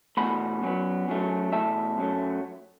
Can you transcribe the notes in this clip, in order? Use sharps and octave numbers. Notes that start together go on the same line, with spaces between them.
E2 B2 A3 F#5 B5
F#2 F#3 B3
F#2 F#3 A3
E2 B2 A3 E5 A5
F#2 F#3 A3